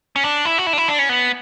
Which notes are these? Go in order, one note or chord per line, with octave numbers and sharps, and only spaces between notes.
C#4
D4
E4
F#4
E4
D4
E4
D4
C#4
B3